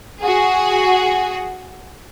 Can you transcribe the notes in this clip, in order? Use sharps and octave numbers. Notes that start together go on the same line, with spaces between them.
F#4 G#4